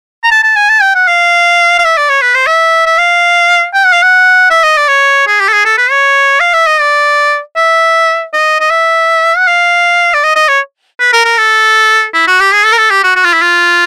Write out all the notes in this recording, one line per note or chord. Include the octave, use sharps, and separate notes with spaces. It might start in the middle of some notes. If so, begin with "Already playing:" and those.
A#5
A5
A5
G#5
A5
G5
F#5
F5
F5
E5
D5
C#5
B4
C5
E5
E5
F5
G5
F#5
F5
F#5
E5
D#5
D5
C#5
G#4
G4
A4
G#4
A4
B4
C#5
F5
E5
D#5
D5
E5
D#5
D#5
E5
F#5
F5
D5
D#5
D#5
C#5
B4
A#4
A#4
A4
E4
F#4
G4
G#4
A4
A#4
A4
G4
F#4
F#4
F4
E4
F4